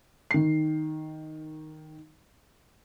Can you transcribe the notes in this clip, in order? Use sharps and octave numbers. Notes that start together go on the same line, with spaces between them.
D#3 C7